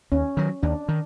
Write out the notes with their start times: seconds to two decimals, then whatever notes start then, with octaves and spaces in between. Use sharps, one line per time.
0.12 D#2 C#4
0.37 D#3 F#3
0.63 D#2 D4
0.88 D#3